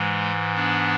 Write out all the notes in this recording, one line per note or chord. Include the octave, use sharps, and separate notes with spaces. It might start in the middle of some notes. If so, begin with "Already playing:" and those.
Already playing: G#2 E3 G#3
B3 D4